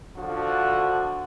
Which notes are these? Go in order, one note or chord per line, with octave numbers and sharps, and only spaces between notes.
D3 F3 F#4